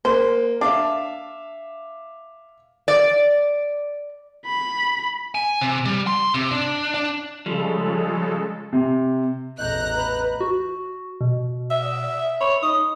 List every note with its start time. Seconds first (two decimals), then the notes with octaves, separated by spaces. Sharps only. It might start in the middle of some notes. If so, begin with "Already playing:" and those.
0.05 A#3 C5
0.61 D4 E5 F5 D6
2.88 D5
4.46 B5
5.35 G#5
5.61 C3
5.86 G3
6.07 C6
6.34 C3
6.51 D4
6.94 D4
7.46 C#3 F3 G3 G#3 A4
8.73 C3
9.58 A1 E2 D#5 A#5 F#6 G6
9.96 B4
10.40 F#4
11.21 B2
11.70 E5
12.41 C#5 B5
12.63 D#4 D#6